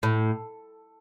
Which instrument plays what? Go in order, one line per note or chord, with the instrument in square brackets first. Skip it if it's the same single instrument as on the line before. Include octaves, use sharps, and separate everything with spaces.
[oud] A2